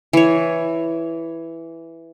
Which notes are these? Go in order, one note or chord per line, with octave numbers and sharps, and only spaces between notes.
E3 C#5